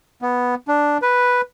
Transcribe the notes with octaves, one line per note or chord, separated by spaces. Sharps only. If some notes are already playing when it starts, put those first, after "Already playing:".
B3
D4
B4